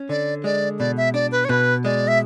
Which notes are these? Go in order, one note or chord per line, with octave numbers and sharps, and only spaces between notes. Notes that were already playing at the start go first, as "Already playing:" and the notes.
Already playing: C#4
D3 D5
G#3 D5
B2 D5
E5
D4 D5
B4
C#5
B2 B4
G#3 D5
E5